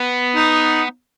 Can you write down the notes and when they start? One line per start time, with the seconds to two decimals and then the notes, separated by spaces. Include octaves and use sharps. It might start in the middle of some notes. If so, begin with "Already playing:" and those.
Already playing: B3
0.36 D#4